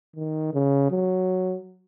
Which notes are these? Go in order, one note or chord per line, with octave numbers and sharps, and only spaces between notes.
D#3
C#3
F#3